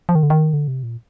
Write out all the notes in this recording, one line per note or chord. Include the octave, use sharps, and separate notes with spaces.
F3
D#3
D3
D#3
D3
C3
A#2